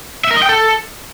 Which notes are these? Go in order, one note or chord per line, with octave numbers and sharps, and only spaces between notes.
E5
A#4
D#5
G5
A4